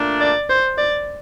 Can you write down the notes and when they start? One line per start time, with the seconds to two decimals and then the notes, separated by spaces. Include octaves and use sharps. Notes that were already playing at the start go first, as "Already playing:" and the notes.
Already playing: A#2 A3 D4
0.21 D5
0.50 C5
0.78 D5